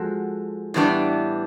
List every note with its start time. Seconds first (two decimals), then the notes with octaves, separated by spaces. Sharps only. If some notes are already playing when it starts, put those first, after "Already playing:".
Already playing: F3 G#3 F#4 A4
0.74 A2 E3 G3 B3 D4